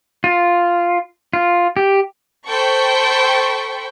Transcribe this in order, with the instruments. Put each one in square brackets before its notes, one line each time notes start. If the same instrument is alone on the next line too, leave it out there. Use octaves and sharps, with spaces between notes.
[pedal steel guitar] F4
F4
G4
[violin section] A4 C5 G5 B5 C#6